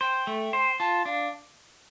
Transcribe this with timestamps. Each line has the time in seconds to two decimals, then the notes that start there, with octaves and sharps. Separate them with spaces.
0.01 C5 G5
0.27 A3
0.53 C5
0.79 F4 A5
1.05 D4 F5